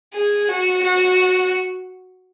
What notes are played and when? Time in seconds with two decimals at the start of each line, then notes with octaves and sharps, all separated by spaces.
0.13 G#4
0.49 F#4
0.84 F#4